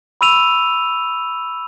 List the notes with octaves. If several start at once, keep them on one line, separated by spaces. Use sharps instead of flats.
B5 C#6 E6 D#7 F7